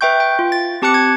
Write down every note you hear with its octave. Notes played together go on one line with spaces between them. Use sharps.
B4 E5 G5 C#6 G6
G5
F4
A6
C4 G4 A5 D6 F#6 C#7
G#6